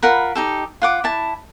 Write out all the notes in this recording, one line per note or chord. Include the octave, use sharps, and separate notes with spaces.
F4 A#4 F#5 B5
D#4 G4 A4
F4 F#5 D6
E4 A5